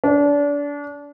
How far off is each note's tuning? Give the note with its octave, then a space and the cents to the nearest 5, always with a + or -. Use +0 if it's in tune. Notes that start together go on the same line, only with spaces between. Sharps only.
D4 -30